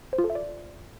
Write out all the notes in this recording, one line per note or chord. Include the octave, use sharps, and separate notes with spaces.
C5
F4
A4
E5
D5